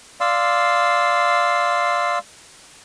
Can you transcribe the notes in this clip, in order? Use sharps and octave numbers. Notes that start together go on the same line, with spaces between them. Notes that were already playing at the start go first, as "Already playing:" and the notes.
D5 F5 C6 E6